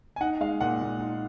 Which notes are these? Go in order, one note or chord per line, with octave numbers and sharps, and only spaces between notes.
G#5
D#4 F#5
G#3 F5
A#2 F#5
A#2
D#4